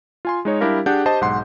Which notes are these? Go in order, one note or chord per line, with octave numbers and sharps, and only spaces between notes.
F4 G#5 C6
G#3 D#4 C#5
G3 D4 E4 G4 A#4 F5
D4 G4 G#4 F#5 G6
G4 C5 D#5 A5
B1 G#2 F#5 C6